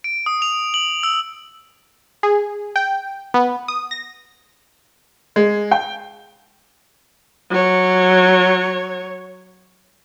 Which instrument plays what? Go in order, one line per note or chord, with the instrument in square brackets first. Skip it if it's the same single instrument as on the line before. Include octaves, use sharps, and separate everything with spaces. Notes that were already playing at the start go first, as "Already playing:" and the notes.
[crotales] D7
D#6
F7
F#7
E6
[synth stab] G#4
G5
B3
D#6
A#6
[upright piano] G#3
G5
[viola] F#3 C#5